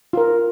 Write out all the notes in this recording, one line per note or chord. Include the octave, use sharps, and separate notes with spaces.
F4 A#4